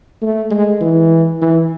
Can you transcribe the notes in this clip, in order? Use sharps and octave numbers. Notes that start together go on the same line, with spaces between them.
A3
G#3
E3
E3